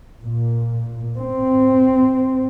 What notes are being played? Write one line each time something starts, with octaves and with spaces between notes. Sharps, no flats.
A#2
C4